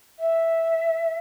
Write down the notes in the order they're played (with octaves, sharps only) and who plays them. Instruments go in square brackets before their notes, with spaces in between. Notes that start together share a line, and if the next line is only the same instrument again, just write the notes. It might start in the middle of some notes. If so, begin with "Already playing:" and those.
[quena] E5